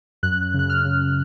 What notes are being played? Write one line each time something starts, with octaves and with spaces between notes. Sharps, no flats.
F#2 F#6
C#3 F#6
F6
C#3